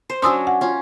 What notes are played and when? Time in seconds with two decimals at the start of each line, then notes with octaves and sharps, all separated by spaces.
0.10 C5
0.22 F#3 C#4 D4 C6 D#6 E6
0.47 F#5
0.61 C#4 F4